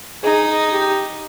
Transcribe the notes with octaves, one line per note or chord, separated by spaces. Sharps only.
D#4 G#4
G4